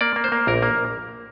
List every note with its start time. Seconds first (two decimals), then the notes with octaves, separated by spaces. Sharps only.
0.01 A#3 D5
0.16 A#3
0.24 C5
0.32 A#3
0.47 A#1 A#4
0.62 A#3